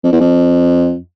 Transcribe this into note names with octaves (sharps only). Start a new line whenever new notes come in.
F2
E2
F2